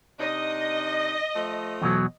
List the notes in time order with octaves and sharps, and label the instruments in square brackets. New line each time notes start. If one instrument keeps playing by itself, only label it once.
[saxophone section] C3 D4 D#4 [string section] D#5
[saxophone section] F3 A3
[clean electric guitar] E2 B2 F#3